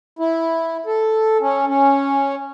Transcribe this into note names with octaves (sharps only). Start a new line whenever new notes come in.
E4
A4
C#4
C#4